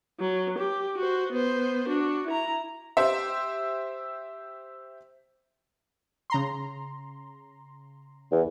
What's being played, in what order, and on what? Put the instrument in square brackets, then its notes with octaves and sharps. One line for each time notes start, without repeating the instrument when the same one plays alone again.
[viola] F#3
G4
F#4 C5
B3 C5
D4 F#4
E4 A#5
[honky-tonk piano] G4 C5 E5
[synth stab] C#3 A#5 C6
[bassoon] E2